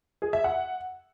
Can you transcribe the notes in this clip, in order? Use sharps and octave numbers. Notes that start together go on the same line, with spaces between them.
G#4
E5
F#5